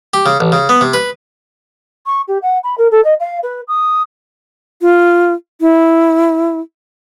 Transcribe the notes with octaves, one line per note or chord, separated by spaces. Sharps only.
G4
C#3
A1
C#3
B3
C3
B4
C#6
G4
F#5
B5
A#4
A4
D#5
F5
B4
D#6
F4
E4